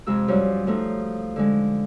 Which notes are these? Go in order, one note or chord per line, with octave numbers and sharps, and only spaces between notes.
F2 C3 G#3 F4 E6
F#2 F3 G3
F3 A3 D#4
D3 G#3